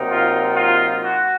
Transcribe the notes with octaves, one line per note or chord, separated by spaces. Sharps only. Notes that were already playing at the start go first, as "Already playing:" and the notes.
Already playing: C3 F#3 A#3 D#4
F4
F4
F#4